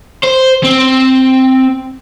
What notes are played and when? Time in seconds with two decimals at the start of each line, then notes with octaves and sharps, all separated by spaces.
0.24 C5
0.64 C4